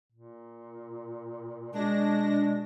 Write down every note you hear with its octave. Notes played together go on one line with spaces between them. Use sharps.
A#2
B2 G#3 D4 A#6